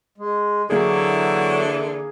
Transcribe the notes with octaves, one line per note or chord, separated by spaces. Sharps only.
G#3
D3 E3 F#3 A#3 E4 G#4